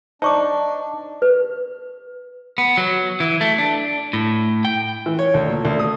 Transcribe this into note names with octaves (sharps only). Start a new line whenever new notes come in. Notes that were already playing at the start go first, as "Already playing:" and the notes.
D4 D#4 C5 D5 D#5 A5 C#6 D6
B4
B3
F#3
E3
A3
D4
A2
G5
E3
C#5
D2
A#2
D2
D#6